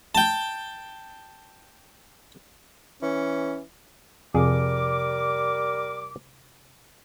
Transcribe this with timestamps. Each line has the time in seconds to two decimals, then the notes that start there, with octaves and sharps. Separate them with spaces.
0.15 G5 A5
3.02 E3 C#4
4.35 F2 C3 G3 G#4 A#4 D6